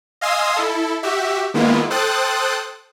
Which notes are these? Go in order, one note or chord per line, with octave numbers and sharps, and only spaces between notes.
D#5 F5 G#5 C6 D#6 E6
E4 A4
F#4 G4 E5
D#3 G#3 A#3 B3 E4 F4
A4 C5 G5 D#6 F#6 A6